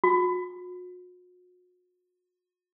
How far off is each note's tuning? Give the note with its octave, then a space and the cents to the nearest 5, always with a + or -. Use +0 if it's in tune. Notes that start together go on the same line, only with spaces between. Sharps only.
F#4 -40